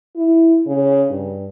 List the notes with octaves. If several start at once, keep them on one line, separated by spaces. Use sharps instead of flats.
E4
C#3
G2